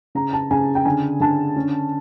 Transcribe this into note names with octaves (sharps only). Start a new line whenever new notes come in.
C#3 A#5
A5
C#3 G#5
G5
D3 G#5
D3 A5
C#4